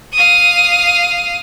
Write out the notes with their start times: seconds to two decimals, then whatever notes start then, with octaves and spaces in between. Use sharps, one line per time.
0.13 F5 D#6